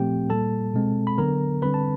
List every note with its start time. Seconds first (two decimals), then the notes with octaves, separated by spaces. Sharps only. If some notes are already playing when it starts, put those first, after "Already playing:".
Already playing: A#2 F3 A3 C4 G4 G5
0.30 A#2 G3 A#3 A4 A5
0.74 B2 G#3 C4
1.07 B5
1.18 D3 F#3 B3 A#4 A#5
1.62 D3 G3 C4 B4 B5
1.74 A5